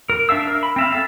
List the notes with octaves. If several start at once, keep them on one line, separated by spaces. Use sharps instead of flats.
A#4
D4 E5 F5 E6
A#4
B5
C4 E5 F5
A4 E5